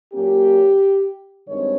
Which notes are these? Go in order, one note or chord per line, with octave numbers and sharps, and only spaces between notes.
A#2 F#3 A#3 C#4 G4
G2 D#3 G#3 C4 C#5